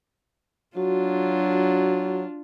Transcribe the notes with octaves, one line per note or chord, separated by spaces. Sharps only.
F#3 D4 F4 F#4